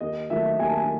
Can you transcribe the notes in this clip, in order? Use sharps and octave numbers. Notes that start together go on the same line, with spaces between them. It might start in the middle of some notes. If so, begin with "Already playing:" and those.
D#2 D#5
D#3 F#3 A3 E5
D#2 G#5
A5
G#5